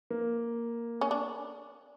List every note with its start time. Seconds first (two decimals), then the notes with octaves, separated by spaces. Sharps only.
0.10 A#3
1.01 C#4
1.11 D4